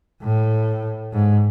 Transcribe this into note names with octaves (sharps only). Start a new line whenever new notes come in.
A2
G#2